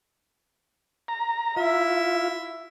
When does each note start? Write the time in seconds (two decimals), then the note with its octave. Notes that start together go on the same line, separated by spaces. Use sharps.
1.08 A#5
1.57 E4 F4 E5